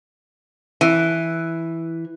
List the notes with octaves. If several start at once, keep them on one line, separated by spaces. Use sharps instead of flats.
E3